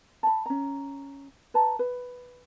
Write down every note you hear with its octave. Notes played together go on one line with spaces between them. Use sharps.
A5 B5
C#4 A#5
B4 A5 A#5
B4